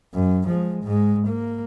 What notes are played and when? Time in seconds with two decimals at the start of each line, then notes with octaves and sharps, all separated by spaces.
0.14 F#2
0.46 F3 G#3
0.84 G#2 G#3
1.26 A#3